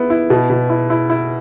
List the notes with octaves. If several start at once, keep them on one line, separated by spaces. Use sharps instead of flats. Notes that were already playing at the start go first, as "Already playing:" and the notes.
Already playing: B3 E4
E4
B2
B2
E4
E4
E4